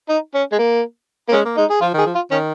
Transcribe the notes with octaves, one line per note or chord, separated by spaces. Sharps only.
D#4
C#4
G#3
A#3
A#3
G#3 C#4
A#3
G#3 D#4
G#4
F3 F4
D#3 G#4
F3
F4
D#3 C#4